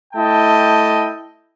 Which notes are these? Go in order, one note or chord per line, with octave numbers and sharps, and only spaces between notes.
A3 E4 D#5 G5 A5